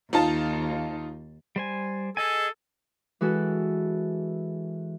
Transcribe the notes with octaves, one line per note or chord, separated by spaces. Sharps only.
D#2 D#4 F4 A5
G3 C5 G#5
G#4 A4 D#5 G#5
E3 G#3 F#4 A4 B4